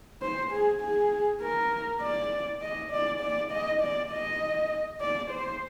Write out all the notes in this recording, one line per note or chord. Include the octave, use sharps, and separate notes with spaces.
C5
G#4
G#4
A#4
D5
D#5
D5
D5
D#5
D5
D#5
D5
C5